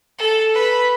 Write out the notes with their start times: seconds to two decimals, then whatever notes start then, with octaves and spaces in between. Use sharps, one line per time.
0.19 A4
0.54 B4 B5